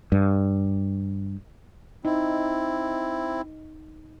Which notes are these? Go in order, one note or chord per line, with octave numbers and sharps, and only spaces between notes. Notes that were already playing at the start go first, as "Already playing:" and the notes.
G2
C4 D#4 E4